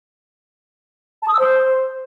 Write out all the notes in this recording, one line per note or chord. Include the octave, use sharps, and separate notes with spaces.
A5
D#6
E6
C5